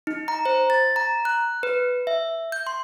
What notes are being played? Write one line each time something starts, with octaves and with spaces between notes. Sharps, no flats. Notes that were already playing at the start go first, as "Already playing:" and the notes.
D#4
A#5
C5
A6
A#5
F#6
B4
E5
G6
C6